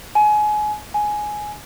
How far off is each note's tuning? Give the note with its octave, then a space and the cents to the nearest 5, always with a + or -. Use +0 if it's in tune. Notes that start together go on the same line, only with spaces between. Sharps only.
G#5 +25
G#5 +10